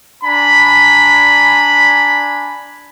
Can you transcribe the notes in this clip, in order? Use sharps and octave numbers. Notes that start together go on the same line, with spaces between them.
D4 G#5 A#5 B5